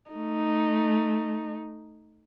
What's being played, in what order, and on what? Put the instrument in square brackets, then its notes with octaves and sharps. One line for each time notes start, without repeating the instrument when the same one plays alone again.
[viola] A3 D#4